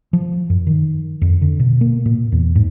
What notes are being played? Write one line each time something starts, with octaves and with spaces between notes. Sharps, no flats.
F3
F#2
D#3
F2
D3
B2
A#3
A#2
E2
G#2